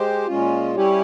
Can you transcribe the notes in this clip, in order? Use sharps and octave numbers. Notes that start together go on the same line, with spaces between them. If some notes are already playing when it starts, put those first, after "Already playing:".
Already playing: G#3 G4 C5
A#2 G#3 C#4 F4
G3 C#4 E4 G4 C#5